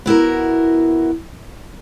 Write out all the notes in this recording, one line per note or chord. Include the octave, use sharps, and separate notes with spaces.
B3 E4 F#4 A#4